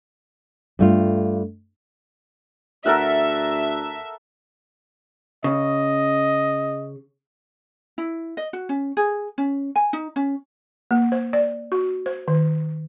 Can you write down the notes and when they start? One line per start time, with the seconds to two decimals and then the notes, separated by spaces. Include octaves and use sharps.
0.79 G2 A3 F4
2.85 D2 A4 A#4 E5 F#5
5.44 C#3 D#5
7.98 E4
8.37 D#5
8.53 F#4
8.69 C#4
8.97 G#4
9.38 C#4
9.76 G#5
9.93 D#4
10.16 C#4
10.91 A#3
11.12 C5
11.33 D5
11.72 F#4
12.06 C5
12.28 D#3